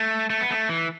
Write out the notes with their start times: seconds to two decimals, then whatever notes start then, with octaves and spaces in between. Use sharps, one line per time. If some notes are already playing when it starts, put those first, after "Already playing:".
Already playing: A3
0.30 A3
0.41 B3
0.50 A3
0.69 E3